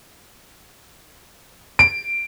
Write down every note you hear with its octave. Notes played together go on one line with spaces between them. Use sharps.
D7